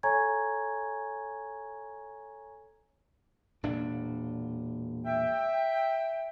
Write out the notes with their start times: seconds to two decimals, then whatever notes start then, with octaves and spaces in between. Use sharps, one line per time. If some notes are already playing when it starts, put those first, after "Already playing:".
0.03 A4 C#5 G#5 A#5 C#6 G#6
3.63 E1 A#2 D4
5.04 E5 G5